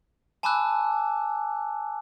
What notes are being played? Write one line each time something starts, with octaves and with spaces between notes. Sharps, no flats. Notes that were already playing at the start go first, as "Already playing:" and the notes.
G#5 A5 B5 D6 E6 F#6